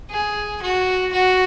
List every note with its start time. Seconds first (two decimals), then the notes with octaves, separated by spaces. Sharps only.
0.10 G#4
0.62 F#4
1.13 F#4